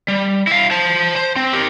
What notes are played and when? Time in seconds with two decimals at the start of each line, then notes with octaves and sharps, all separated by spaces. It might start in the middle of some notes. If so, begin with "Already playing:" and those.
0.08 G3
0.47 E4 F5
0.71 C5 A5
1.16 C5
1.36 C4
1.53 G4 A#4